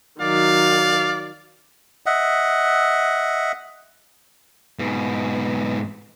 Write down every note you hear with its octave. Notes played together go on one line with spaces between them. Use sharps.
D#3 F#3 D5 F5
D#5 E5 F#5
G#2 B2